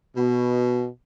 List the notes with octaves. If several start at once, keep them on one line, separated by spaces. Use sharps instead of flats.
B2